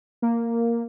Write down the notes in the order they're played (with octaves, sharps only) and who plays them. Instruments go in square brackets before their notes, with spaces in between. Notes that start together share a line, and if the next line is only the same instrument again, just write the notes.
[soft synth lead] A#3